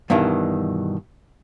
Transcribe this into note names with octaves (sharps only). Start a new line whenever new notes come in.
G2 B2 D#3 E3